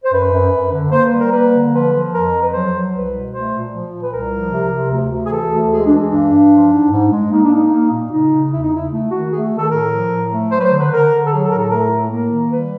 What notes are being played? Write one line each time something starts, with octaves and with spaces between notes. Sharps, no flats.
C5
F#2 B4
F#2
F#2
D3
A#3 C5
B4
G3
A#4
A#3 B4
D3
F3 B4
F3
F2 A#4
F3
B4
F#3 C5
F#3
C2 B4
B2
A3 C5
A#2
F3
A#2
B4
C2 A#4
F3
C3
C3
D2
D2
G#4
E3 A4
D2
G#3 G#4
D4
E3
G2 D4
G2
F3
G#2
G#2
G#3
A#3 D#4
D4
A#3 D#4
A#3
A#2
C#3 D#4
C#3
E2 E4
D#4
C#3 E4
A3
D#3 F#4
A3 G#4
D#3
A4
A2 A#4
F3
A2
A3
F#3 C5
B4
C5
D3
B4
D3 A#4
D3
A4
F#3 G#4
A4
A2 A#4
A4
A3 A#4
A2
A#3 A#4
D#3
G3 B4